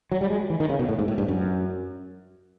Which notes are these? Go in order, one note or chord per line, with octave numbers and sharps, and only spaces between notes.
F#3
G3
G#3
E3
D#3
C#3
B2
A2
G#2
A2
G2
F#2